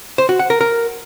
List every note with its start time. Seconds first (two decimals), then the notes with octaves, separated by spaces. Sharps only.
0.18 C5
0.29 F#4
0.39 F#5
0.50 A#4
0.61 A#4